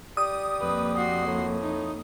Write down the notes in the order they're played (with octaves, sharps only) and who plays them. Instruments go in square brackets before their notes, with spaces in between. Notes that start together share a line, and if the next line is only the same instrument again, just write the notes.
[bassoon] G3 [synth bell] D#6
[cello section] F2 A#3 [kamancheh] B4
[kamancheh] F#4 C6
[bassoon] A2
[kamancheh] D#4